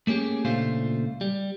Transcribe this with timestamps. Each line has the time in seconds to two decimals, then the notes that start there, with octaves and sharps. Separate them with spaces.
0.07 A3 A#3 C#4 G4 G#4
0.45 C#2 A#2 A3 D4 F4 C5
1.21 G3